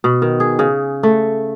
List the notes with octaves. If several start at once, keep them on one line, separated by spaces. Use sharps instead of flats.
B2
D#3
G#4
C#3
A3